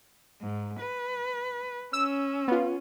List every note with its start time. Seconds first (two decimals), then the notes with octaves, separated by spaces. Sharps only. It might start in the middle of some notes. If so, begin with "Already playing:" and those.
0.42 G#2
0.80 B4
1.93 C#4 E6
2.48 B3 F4